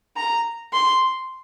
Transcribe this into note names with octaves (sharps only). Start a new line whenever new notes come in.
A#5
C6